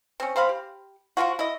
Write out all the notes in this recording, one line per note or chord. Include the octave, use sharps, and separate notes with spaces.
C4 C#4
C4 C5 F5 B5
G4
F3 F#3 F4 F#4
E4 D#5